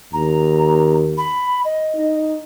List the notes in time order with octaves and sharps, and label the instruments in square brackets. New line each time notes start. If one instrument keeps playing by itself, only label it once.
[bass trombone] D#2 [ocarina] A#5
[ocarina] B5
D#5
[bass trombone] D#4